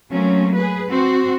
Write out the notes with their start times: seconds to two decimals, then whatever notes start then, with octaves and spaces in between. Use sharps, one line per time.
0.10 F#3 A3 A#3 C4 C#4
0.55 G#4 B4
0.89 C4 F#4 C5